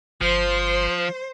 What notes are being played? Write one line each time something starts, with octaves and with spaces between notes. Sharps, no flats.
G1 F3 C5